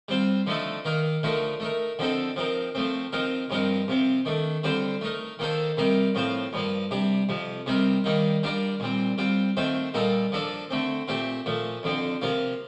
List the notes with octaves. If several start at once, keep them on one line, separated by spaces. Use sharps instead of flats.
G3 C4 F4 C5
D3 F3 A3 D#4 A4
D#3 A#3 D#4 A#4
D3 F3 A3 D#4 A#4
A3 D#4 A#4
D3 F3 C4 D#4 A4
F3 C4 D#4 A#4
F3 A3 C4
F3 C4 D#4 A#4
G2 F3 C4 D#4 A#4
C3 F3 C4
D#3 A3 D4
D3 G3 C4 F4 C5
A3 D#4 A#4
D#3 A#3 D#4 A4 C5
C3 G3 A#3 D#4 A#4
A2 F3 C4 F4 C5
G2 F3 A#3
C3 G3 D4
F2 C3 F3
C3 G3 C4 D#4 A#4
D#3 G3 A#3 D#4
G3 D4 F4 A#4 D5
A#2 G3 C4
G3 C4 F4
D#3 A3 C4 F4 C5
A#2 G3 A#3 D#4 A4
F3 A#3 D4 A4 D5
D3 A3 C4
A#2 A3 C4 G4
A#2 F3 A3
F2 D3 F3 C4
C3 F3 A#3 F4